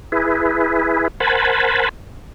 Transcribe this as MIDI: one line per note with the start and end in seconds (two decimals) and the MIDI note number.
0.12 1.08 64
0.12 1.08 68
0.12 1.08 71
1.20 1.89 70
1.20 1.89 72
1.20 1.89 78
1.20 1.89 80
1.20 1.89 81
1.20 1.89 83